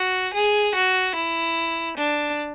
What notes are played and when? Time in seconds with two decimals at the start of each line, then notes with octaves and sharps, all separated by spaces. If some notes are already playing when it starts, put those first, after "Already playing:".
Already playing: F#4
0.34 G#4
0.75 F#4
1.15 E4
1.97 D4